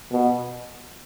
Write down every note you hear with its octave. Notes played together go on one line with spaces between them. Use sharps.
B2